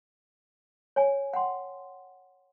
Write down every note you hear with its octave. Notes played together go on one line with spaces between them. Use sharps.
C#5 G#5
F#5 G5 C6